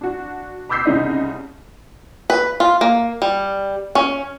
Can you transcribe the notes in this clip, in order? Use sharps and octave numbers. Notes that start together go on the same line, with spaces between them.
D4 F#4
B5 D6 E6 G6 B6 C7
C2 C#3 D#4 D#5
B4
F4
A#3
G3
C#4